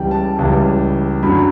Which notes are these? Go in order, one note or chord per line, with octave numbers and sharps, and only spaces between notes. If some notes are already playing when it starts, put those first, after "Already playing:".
Already playing: C#2 C#3 E3 G3 G5
A5
C#2 C#3 E3 G3
F#2 D3 F#3 B5